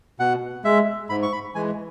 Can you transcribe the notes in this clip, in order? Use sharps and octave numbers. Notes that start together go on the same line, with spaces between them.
B2 F#5
G#3 E5
G#2 B5
C#6
B5
E3 G#3 G#5